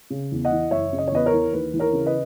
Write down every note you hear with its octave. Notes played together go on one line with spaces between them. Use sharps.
C#3
E2
D#5 F#5
E3
F#1 C#5 E5
C#3
D#5
C#5
E2 B4 D#5
A#4 C#5
E3
D#2 B4
E3
A#4 C#5
C#3
B4 D#5